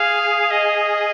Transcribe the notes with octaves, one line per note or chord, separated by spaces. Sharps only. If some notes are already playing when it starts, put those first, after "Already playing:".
Already playing: G#4 F5
D#5